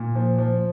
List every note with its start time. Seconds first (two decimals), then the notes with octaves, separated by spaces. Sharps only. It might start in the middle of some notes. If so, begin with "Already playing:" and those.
Already playing: A#2
0.15 F3
0.38 F3